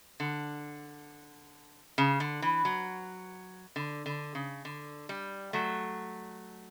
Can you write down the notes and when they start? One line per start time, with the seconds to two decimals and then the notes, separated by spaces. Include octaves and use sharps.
0.20 D3
1.98 C#3
2.20 D3
2.42 E3
2.65 F#3
3.76 D3
4.06 D3
4.35 C#3
4.65 D3
5.09 G3
5.53 F#3 A3